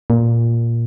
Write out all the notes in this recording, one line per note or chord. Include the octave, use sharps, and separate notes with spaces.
A#2